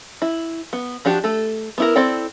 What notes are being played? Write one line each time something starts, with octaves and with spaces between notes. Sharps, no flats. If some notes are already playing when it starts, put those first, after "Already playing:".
E4
B3
F3 D4 F#4 G4
A3 A4
B3 E4 A#4
C4 E4 A4 D5 G5